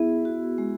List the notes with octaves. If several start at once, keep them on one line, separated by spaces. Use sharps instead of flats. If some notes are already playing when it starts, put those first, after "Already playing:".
Already playing: B3 E4 G#4
F#4
G#3